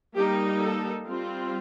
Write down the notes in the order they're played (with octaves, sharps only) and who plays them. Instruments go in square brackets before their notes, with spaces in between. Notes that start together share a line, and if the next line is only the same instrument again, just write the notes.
[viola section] G3 A#3 D#4 G4
A4
G3 C4 F4